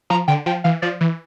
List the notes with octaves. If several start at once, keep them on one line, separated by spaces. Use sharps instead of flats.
F3 A#5
D3 G5
F3 G5
E3 F5
F3 D5
E3